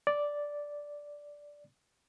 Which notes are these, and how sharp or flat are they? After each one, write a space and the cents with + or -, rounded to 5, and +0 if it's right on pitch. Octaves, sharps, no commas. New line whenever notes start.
D5 -5